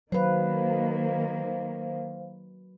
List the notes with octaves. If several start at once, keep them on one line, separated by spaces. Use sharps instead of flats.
D#3 F#3 A#3 B4 C5 F5